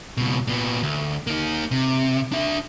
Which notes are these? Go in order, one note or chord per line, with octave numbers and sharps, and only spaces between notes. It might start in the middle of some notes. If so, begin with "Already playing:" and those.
C#2 B2
A#2 B3
D2
A#3 D#4
C3
D4 E5